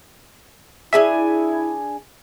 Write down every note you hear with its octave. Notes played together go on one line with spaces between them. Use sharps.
D4 E4 G#4 E5 G#5